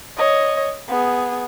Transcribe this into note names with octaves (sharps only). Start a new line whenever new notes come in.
C#5 D#5
B3 G#4